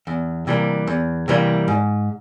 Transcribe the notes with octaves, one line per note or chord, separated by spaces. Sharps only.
E2
C3 E3 G3 A#3
E2
C3 E3 G3 A#3
G#2